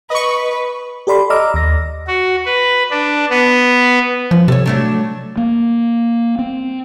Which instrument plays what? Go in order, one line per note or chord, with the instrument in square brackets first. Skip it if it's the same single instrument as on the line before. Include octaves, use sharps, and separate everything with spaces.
[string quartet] B4 [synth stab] D#5 C#6
[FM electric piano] G4 A4 D5 B5 C6
D5 D#5 A#5 D6 E6 F6
D#2 A#6
[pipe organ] F#4
B4
D4
B3
[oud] F#2 [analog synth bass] F3
[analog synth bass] C3 [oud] A4 C#5
[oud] F#3 A3 D4
[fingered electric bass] A#3
C4